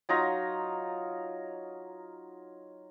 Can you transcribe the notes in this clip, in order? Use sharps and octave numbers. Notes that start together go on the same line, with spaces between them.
F#3 D#4 F4 A#5